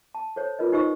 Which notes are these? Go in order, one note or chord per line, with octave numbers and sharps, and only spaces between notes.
A5
A4 C5 C#5
F4 A#4 B4 D#5
D#4 G4 C5 D#5 C#6 E6